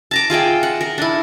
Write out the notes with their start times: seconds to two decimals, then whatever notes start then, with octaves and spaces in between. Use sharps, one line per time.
0.11 A5 A#5 D6
0.30 F4 G#4 E5 G5
0.63 F#5
0.81 A#4
0.98 D4 E4